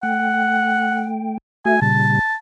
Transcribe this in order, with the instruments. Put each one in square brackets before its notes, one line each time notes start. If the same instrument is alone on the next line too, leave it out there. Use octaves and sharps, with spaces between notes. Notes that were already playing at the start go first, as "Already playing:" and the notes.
[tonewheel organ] A3 G5 [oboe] F#5
[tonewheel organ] A3 F#4 E5 [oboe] G#5
[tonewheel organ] A#2 C#3 G3 [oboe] A5